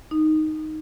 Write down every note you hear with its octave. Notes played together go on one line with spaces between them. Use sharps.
D#4